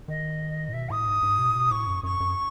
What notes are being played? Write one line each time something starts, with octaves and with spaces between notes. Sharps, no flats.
D#3 D#5
A2
B2 E5
A2 D#6
G#2
G#2
B2
A2
B2
A2 C#6
F#2
F#2 C#6
F#2